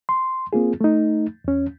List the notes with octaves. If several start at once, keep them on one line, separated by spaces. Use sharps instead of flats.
C6
A#3 C4 F4 G#4
A3 D#4
E2 C#4